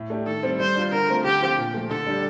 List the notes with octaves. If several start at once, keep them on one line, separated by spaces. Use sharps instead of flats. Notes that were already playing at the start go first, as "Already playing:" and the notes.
Already playing: A2
A3 D4 G4
D#3 A4
G3 C4
G3 C5
D4 F4
D3 A#4
A3 C4 F4
D3 G4
F3 C4 F4
A#2
F3 A3
D3 A4
G3 D4 G4